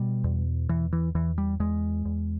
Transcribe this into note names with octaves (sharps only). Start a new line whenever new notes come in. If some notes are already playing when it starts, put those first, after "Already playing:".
Already playing: B2 G3
E2
E2 E3
E3
E2 E3
G3
E2 G#3
E2